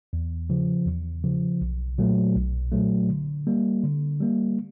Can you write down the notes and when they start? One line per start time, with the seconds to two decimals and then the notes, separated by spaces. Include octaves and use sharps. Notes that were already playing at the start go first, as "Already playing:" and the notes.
0.13 E2
0.50 C#3 F3
0.86 E2
1.24 C#3 F3
1.61 B1
1.98 A#2 F#3 A3
2.36 B1
2.72 A#2 F#3 A3
3.09 D3
3.47 G3 A#3
3.83 D3
4.20 G3 A#3